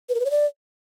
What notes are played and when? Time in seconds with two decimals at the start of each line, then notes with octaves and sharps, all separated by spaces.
0.09 B4
0.15 A#4
0.20 B4
0.25 C#5
0.31 D5